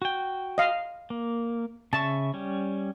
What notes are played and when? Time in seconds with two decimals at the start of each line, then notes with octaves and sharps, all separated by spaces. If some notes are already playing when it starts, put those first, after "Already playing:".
0.02 F#4 G5
0.58 D#5 F5
1.10 A#3
1.93 C#3 E5 A5 C#6
2.34 G3 C#4